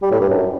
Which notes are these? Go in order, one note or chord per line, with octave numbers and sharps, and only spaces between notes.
G3
A2
G2
F#2